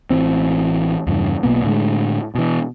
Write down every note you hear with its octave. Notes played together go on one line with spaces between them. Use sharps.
A1 E3 C4
E2 G2 C#3
B1 B2 A#3 B3
A2 D3 F#3 G#3
B2 E3